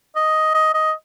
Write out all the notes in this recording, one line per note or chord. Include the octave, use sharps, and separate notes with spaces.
D#5
D#5
D#5